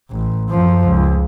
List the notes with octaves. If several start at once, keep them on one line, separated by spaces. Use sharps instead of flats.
A1
F#2 F3
C#2